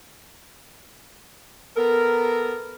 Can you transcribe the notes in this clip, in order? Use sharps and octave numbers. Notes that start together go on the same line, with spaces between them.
B3 A4 A#4